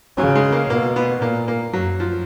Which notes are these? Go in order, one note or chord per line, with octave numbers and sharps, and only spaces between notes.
C#3 F#3
G#3
A#3
B2 A#3
B3
A#2 A#3
A#3
F#2 F#3
F3